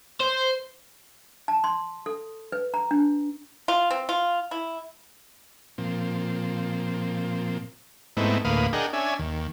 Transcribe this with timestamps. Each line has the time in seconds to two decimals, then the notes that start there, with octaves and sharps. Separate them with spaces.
0.21 C5
1.48 A5
1.64 C6
2.06 A4
2.52 B4
2.74 A#5
2.91 D4
3.68 F4
3.90 C4
4.09 F4
4.51 E4
5.78 A#2 F3 C4
8.17 G#2 A3 B3 C4 D#4 E4
8.45 D2 A2 A#3 B4 F5 D#6
8.73 D4 G#4 A#4 D#5 F#5 G5
8.93 C#4 D4 E5 G#5
9.19 D#2